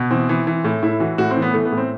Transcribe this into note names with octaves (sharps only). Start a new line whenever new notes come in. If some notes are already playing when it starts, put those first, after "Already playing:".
Already playing: B2
E3 C4
E3
E3
A2
A2 E4
E3 F#4
A2 F#4
C4
E3
B3
E3 A3
B3
A2
C4